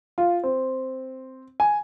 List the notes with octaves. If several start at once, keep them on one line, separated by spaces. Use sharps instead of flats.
F4
C4
G#5